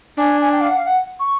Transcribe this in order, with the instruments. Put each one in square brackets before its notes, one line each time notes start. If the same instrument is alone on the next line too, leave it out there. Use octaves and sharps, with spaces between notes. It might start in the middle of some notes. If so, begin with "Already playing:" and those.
[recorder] D4 [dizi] G#5
[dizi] G#5
G5
F5
F#5
F5
F#5
C#6